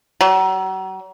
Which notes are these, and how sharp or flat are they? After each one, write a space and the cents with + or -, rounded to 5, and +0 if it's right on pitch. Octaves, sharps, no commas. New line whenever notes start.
F#3 +40